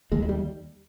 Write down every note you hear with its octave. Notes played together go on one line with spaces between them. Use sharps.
D#2 G#3
G#3
G3